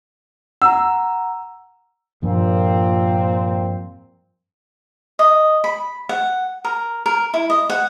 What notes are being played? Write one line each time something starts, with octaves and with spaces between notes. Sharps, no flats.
F#5 A#5 E6
G2 A#2 F3 C4
D#5
B5
F#5
A#4
A#4
E4
D#5
F#5